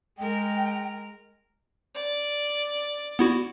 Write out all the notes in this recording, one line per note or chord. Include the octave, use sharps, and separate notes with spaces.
G#3 A#4 G5
D5
B3 E4 F#4